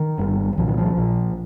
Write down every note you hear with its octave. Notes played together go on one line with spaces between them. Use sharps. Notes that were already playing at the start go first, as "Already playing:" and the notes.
Already playing: D#3
G1 G2
C2 A#2 F3
D#3
F3
A#1 A#2